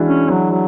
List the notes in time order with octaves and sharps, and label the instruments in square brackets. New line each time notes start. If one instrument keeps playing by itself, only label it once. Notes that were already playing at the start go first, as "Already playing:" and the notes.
Already playing: [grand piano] E3 G#3 D4 F#4
[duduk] C#4
F#3
F#3